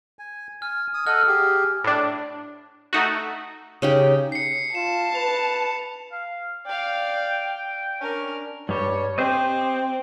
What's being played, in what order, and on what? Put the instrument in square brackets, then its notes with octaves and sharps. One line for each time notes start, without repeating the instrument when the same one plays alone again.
[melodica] G#5
[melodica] G#5 [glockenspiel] F6
[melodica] D#6
[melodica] A4 D#5 F#5 [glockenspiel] F6
[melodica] G4 G#4
[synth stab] A2 D4
A3 D#4 F#4
[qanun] C#3 D#4 G4
[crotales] C7 C#7
[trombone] F4 [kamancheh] A5 [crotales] E7
[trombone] B4 [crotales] F7
[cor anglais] F5
[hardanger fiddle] D5 F5 [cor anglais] G5
[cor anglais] C#4 [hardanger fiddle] D4 A#4
[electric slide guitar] G2 G3 [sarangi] C#5
[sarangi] C4 [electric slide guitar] G4 C5 D#5